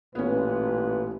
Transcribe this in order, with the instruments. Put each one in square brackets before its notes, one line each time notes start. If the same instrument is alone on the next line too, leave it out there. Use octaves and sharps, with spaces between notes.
[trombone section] A1 A#2 B4 [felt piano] B3 C#4